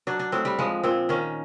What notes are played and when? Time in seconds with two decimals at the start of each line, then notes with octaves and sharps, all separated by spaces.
0.07 F#3 D4
0.19 D4
0.32 A2 C4
0.45 G3
0.59 F3 G#3
0.84 A#2 C4
1.09 D#3 C#4